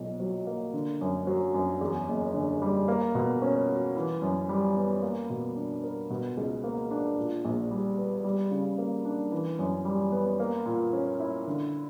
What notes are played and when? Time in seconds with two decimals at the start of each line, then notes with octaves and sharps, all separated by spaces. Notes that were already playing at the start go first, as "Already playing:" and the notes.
Already playing: B1 A#2
0.20 F#3
0.47 A#3
0.73 D3
1.01 F#2
1.27 F#3
1.54 F#2
1.81 E2
2.08 F#1
2.34 D3
2.62 G3
2.88 A#3
3.15 B2
3.42 C#4
3.68 F#4
3.96 E3
4.22 F#2
4.49 G3
4.77 B3
5.02 A#3
5.30 B2
5.56 D4
5.83 A#4
6.10 B2
6.37 C#2
6.64 A#3
6.91 D4
7.17 A#2
7.44 A#1
7.71 G3
7.98 B3
8.24 G3
8.51 C#3
8.78 A#3
9.05 D4
9.32 E3
9.59 F#2
9.85 G3
10.12 B3
10.40 A#3
10.66 A#2
10.93 C#4
11.20 E4
11.47 D3